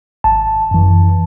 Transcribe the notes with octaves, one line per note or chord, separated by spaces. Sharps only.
G#1 A5
F#2 E3